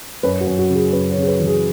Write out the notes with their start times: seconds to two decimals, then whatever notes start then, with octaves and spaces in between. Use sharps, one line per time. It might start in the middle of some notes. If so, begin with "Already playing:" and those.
0.23 F#2 B4
0.41 F#4
0.47 F#2
0.58 F#4
0.70 C#3
0.75 G#4
0.93 F#2 B4
1.11 C#5
1.17 C#3
1.23 G#4
1.28 B4
1.40 E3
1.46 G#4